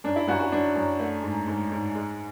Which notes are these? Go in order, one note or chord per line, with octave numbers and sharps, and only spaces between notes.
F#2 D4
E4
F#2 F#4
F#4
F#3 D4
F#2
A3
G#2
G#2
G#2
G#3